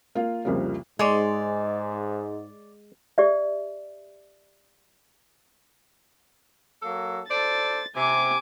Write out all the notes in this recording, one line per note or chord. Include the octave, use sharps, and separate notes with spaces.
A#3 F4
C2 F2 C#3 F3 G3 A#3
G#2 G#3 C#5 D5 C6
G4 D5 E5
F#3 A#3 A4
A4 C5 D5 A6
C3 G#5 D6